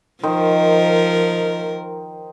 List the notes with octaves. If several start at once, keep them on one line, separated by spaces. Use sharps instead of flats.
D#3 F3 A#4 C5 D#5